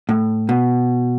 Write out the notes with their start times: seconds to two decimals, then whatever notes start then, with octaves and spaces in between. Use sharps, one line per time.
0.09 A2
0.49 B2